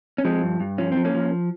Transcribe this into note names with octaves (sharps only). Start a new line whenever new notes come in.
C#4
F3 G#3 C4
G2
G2
F3 C#4
F3 C4
A#3 C#4
F3